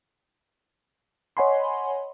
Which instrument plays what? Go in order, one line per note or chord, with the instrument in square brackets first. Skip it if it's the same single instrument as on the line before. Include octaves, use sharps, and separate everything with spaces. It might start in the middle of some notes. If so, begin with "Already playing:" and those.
[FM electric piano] C#5 D#5 F#5 G#5 B5 C6